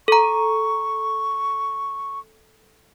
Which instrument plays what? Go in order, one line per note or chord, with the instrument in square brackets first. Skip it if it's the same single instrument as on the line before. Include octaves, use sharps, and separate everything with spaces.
[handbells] A4 A#5 [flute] C#6